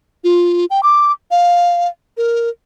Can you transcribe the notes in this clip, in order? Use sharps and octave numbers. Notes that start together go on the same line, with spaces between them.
F4
G5
D6
F5
A#4